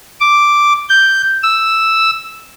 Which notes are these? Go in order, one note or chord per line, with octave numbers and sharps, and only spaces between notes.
D6
G6
E6